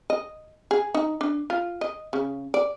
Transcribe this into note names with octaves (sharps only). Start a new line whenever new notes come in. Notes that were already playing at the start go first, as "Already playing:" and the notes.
D#5
G#4
D#4
D4
F4
D#5
C#3
D5